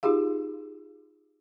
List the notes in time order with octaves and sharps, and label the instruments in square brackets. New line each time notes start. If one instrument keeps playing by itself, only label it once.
[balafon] D#4 F4 G4 G#4 F5